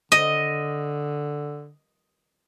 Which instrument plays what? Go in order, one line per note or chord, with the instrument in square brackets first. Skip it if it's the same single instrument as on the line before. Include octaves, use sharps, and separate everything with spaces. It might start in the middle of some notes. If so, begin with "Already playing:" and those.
[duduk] D3 [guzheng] D#5